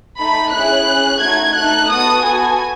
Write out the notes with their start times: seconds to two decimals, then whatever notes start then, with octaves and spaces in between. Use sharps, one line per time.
0.19 A3 D#4 A4 B5
0.53 C#4 E4 G#4 F#6
0.88 C#4 G#4
1.22 A3 D#4 F#4 G#6
1.57 A3 D#4 A4 F#6
1.91 B3 F#4 A4 D#6
2.25 B3 F#4 A4 G#5